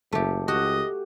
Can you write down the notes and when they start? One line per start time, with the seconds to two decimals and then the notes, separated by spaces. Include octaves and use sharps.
0.12 F#1 A3 G4
0.48 C#2 F#4 G4 D#5